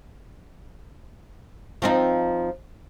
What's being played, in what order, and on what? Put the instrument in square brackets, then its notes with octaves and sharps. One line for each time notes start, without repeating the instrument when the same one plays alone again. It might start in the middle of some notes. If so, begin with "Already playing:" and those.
[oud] F3 C4 D#4